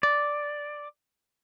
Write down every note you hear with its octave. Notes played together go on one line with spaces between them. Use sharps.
D5